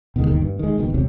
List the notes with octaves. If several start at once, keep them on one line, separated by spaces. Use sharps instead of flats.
B2 D3 D#3 G#3
G1 D#2 D#3
G2
D#3 G#3
F#1 B2 D#3
E1 C2 C3 F#3